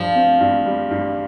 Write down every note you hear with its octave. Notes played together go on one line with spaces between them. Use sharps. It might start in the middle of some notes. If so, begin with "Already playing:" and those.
Already playing: G2 F3
C4
G2
G3
G2